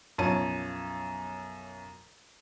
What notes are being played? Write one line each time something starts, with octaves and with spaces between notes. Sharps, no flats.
B1 F#2 F3 C#5 A5 D#7